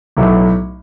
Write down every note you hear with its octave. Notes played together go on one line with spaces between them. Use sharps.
B1 A2 F#3 A3